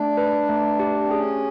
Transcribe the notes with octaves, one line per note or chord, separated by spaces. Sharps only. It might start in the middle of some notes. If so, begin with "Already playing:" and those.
Already playing: A3 D4
B4
A3
G4
C4
C#4 G#4